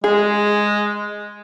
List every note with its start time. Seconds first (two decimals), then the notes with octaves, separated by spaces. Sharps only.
0.04 G#3 G#4